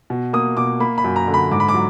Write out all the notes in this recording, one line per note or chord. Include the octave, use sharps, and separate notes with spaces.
B2
A#3 D#6
B2 D6
A#3 B5
B5
F#2
A#5
D3
B5
G#2 D6
B5
D6
F#3